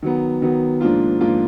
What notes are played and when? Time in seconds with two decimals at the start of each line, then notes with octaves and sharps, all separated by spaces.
0.02 D#3 F#3 B3
0.42 D#3 F#3 B3
0.81 G#2 F3 A#3 D4 F4
1.21 G#2 F3 A#3 D4 F4